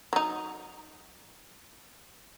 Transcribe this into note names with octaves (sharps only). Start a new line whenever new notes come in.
F#3 D#4